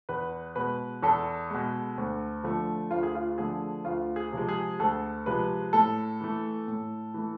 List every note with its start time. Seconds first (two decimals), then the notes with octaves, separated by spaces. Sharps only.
0.09 E2 B4
0.56 B2 G#3 B4
1.02 E2 A4
1.50 B2 G#3
1.98 D2
2.44 D3 F3 A3
2.91 D2 F4
3.03 G#4
3.15 F4
3.38 D3 F3 A3 G#4
3.85 D2 F4
4.16 G#4
4.32 C3 F3 G#3
4.49 G#4
4.79 D2 A4
5.26 C3 F3 G#3 B4
5.73 A2 A4
6.20 E3 A3
6.68 A2
7.14 E3 A3